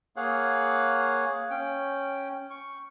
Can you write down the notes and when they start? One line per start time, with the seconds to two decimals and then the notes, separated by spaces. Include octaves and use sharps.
0.16 A#3 G#4 C#5 F5 F#5
1.51 C#4 G5
2.50 C#6